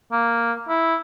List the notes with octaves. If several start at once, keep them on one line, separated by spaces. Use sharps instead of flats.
A#3
E4